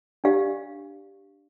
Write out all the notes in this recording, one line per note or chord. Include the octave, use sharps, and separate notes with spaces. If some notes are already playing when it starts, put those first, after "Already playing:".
D4 G4 D5 F5